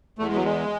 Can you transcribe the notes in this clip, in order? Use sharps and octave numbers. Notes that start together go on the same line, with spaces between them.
E2 A3
G#3
F#3
G#3